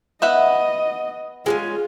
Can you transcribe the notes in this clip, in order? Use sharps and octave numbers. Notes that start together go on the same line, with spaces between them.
B3 D#5 E5 F#5
G#3 A#3 C#4 F4